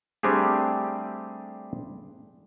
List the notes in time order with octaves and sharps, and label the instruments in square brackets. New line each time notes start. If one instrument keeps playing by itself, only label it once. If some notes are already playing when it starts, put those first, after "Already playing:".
[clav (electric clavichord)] G3 A3 C4 D4 G4 G#4